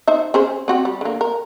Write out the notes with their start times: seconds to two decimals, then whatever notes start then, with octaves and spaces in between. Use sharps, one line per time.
0.07 D#4 C5 E5
0.34 C#4 G#4 C5
0.68 C4 F#4 G4
0.85 G3
1.01 D3 A#3
1.21 A#4